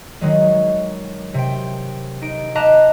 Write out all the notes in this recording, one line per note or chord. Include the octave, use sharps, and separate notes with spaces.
D#3 F#3 G#3
C3 G5
D#4 D7
G4 D#5 F5 A5 A#5 F#6